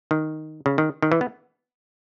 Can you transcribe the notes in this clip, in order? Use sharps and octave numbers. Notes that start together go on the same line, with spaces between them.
D#3
C#3
D#3
D#3
E3
B3